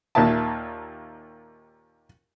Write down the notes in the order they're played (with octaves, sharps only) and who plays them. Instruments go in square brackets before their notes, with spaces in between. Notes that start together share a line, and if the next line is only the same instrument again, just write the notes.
[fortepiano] D#2 A#2 A#3 E5 A5